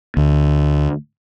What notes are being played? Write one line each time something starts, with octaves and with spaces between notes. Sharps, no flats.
D2